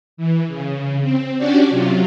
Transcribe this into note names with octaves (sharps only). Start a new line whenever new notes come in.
E3
C#3
C4
C#4 D4 F#4 G4 D5
C3 F#3 F4